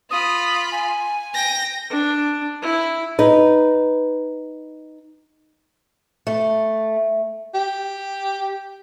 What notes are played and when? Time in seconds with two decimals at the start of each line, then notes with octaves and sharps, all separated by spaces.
0.11 F4 B5 D#6
0.72 G#5
1.34 G5 A#6
1.90 D4
2.63 E4
3.19 D#4 B4
6.27 A3
7.55 G4